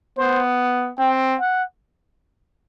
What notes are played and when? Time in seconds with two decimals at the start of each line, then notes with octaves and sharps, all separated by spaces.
0.17 B3 C5
0.99 C4 G5
1.39 F#5